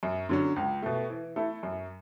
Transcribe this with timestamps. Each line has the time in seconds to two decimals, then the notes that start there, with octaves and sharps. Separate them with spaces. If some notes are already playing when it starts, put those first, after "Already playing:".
0.03 F#2
0.29 D3 F#3 C#4
0.56 C#2
0.82 B2 A3
1.10 E3
1.36 A3 E4 A4
1.63 F#2